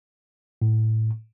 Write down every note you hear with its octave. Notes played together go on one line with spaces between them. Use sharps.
A2